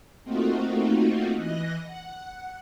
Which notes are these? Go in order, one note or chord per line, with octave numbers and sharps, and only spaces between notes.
A3 A#3 C4 D#4 F4 F#4
E3 D#5 F#6 A#6
F#5